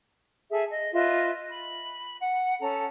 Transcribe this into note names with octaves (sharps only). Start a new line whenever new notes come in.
G#4 A4 E5
D#5
F4 B4 D#5 E5
B5
F#5
C#4 A4 F#5 A#5